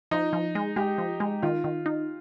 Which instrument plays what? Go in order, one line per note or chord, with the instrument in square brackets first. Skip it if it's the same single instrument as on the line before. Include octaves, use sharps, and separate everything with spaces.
[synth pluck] F3 [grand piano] D#4
[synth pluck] F3
G#3
[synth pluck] G#3 [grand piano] G4
[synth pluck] F3
G#3
[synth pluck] D#3 [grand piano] F4
[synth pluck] D#3
D#4